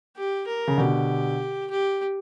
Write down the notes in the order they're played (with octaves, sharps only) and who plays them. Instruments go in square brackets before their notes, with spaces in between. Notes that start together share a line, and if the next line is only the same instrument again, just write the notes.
[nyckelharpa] G4
A#4
[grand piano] C#3
[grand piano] B2 D3 [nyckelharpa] G4
[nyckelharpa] G4